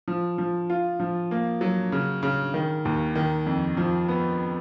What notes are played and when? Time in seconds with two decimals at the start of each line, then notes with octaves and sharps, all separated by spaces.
0.08 F3
0.38 F3
0.70 F4
1.00 F3
1.31 A#3
1.61 F#3
1.92 C#3
2.23 C#3
2.54 D#3
2.85 D#2
3.16 D#3
3.46 F2
3.77 F3
4.08 B3